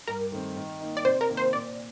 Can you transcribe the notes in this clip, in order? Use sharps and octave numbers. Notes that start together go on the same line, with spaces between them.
G2 A#4
D#3 A3 C4
D#3
A#3 D#4
D5
C3 C5
A#4
D#3 A#3
C5
A#2 D5